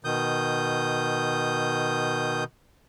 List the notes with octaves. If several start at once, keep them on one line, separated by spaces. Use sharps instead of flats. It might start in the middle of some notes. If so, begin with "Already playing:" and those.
B2 D#3 D#6 G6